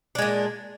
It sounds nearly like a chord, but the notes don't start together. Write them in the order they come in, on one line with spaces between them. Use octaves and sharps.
D4 G#3 A#2